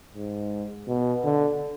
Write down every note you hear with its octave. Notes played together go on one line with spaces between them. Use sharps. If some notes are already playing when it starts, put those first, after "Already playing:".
G#2
B2
D3